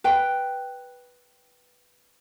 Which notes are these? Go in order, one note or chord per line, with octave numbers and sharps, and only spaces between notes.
B4 G5